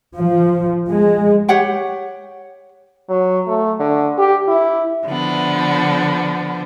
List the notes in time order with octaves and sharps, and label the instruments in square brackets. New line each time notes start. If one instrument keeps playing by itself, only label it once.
[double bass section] F3
G#3
[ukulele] G4 C#5 F#5 G5
[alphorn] F#3
A3
D3
G4
E4
[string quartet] D3 F3 B3